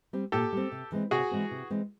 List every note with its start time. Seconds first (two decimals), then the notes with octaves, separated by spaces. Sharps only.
0.13 G3 C4
0.32 A#2 G4 A4
0.52 G3 C4
0.72 C3
0.92 E3 G#3 C4
1.11 C3 F#4 G#4
1.31 E3 G#3 C4
1.51 C3
1.70 E3 G#3 C4